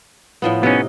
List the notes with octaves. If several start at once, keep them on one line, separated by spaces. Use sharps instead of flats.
A2 F3 B3
C3 B3 C#4 D#4